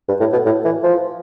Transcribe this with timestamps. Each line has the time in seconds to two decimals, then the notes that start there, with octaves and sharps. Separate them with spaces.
0.09 G2
0.20 A2
0.33 B2
0.46 A2
0.65 E3
0.83 F3